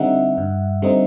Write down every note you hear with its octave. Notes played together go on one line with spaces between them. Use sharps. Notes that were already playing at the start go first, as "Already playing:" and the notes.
Already playing: D3 G3 C4 D#4 E5 F#5
G2
D3 G3 C4 D#4